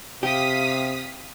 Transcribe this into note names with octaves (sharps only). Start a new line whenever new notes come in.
C3 G4 F5 D#6 B6